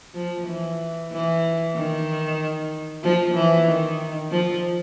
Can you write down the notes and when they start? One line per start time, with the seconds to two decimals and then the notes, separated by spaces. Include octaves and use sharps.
0.15 F3
0.47 E3
1.12 E3
1.75 D#3
3.04 F3
3.35 E3
3.68 D#3
4.31 F3